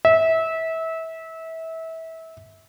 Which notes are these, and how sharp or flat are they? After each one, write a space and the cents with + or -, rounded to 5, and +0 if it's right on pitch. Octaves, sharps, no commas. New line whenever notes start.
E5 -25